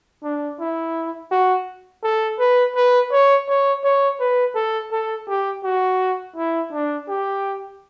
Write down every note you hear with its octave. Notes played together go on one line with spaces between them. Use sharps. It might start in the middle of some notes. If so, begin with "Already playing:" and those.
D4
E4
F#4
A4
B4
B4
C#5
C#5
C#5
B4
A4
A4
G4
F#4
E4
D4
G4